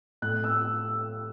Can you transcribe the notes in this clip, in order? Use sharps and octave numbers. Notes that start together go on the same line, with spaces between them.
A2 F#6
E6